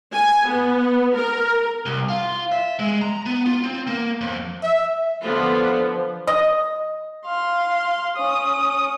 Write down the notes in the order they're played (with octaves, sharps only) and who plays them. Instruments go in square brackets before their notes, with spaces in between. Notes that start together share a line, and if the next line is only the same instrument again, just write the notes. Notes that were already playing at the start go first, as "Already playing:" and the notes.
[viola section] G#5
B3
A#4
[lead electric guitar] C2
F4
E5
G#3
A#5
B3
F4
C4
A#3
F2
[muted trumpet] E5
[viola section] D3 B3 F4 [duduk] F3
[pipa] D#5
[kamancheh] F5 C6
C#4 D#6